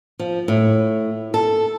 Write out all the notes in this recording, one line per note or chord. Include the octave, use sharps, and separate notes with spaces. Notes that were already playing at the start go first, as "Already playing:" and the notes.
F3
A2
A4